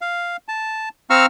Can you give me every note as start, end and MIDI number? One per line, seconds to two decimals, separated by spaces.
0.01 0.37 77
0.48 0.89 81
1.10 1.26 60
1.10 1.26 77
1.10 1.26 82
1.10 1.26 85
1.10 1.26 88
1.10 1.26 89